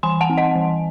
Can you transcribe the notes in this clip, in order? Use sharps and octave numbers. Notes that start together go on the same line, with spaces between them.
E3 G#5 C6
F#5 A5
C4
D#5 F#5
E3